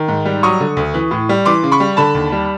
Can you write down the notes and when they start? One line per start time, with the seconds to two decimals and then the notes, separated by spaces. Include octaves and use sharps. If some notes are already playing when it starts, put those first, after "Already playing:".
Already playing: D#3
0.08 G#2
0.25 G3
0.43 F#3 C#6 D#6
0.60 D3
0.77 D2
0.94 E3
1.11 A2
1.29 G3
1.45 E3 C6 D6
1.63 C#3
1.72 B5 C#6
1.80 G3
1.97 D3 A5 B5
2.14 D#2
2.32 G3